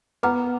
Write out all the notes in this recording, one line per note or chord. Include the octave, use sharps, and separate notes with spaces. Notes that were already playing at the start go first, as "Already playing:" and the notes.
B3 F#5 A#5 D6 F6